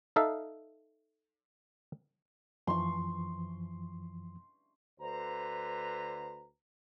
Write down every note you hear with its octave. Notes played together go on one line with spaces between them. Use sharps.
D#4 A4 E5 F5
F#2 E3 F3 C6 C#6
D2 D3 B4 C5 A#5